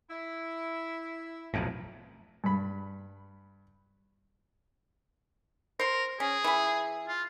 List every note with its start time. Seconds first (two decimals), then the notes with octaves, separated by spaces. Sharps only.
0.09 E4
1.54 B1 F2 A2
2.44 G2 B5
5.80 A#4 C5 C6
6.20 C#4 G#4
6.44 E3 B4
7.07 F4